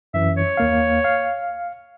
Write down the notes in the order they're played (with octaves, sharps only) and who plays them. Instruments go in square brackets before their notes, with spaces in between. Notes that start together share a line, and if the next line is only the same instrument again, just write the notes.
[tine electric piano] F#2 E3 [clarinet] E5
[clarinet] C#5
[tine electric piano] D#2 A#3 F5
F5